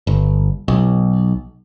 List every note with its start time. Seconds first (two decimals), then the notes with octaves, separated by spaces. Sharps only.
0.07 G1
0.68 B1